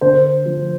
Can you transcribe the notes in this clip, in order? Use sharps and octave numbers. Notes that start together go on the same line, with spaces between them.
D3 C5
F3